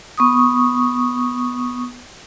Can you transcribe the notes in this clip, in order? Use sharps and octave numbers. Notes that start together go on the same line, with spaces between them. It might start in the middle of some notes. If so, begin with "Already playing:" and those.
B3 C#6 D#6